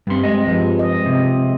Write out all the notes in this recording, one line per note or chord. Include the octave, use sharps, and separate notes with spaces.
G2 G3 C4 C6
G#3 D#5
G2 F3 G#3
D#5
C3